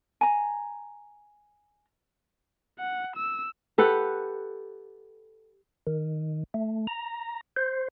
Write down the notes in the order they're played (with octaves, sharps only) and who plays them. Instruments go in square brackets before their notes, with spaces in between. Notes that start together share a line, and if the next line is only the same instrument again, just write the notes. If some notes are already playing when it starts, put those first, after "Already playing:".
[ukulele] G#5 A#5
[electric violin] F#5
E6
[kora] G4 A4 B4 F#5
[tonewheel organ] D#3
A3
A#5
C5